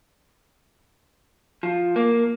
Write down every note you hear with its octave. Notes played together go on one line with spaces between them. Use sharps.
F3
A#3